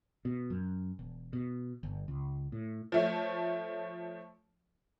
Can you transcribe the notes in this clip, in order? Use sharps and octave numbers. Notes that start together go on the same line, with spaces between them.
B2
F#2
E1
B2
G1
C#2
A2
F3 A3 C#5